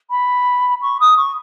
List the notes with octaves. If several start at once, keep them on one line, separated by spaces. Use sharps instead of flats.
B5
C#6
D#6
C#6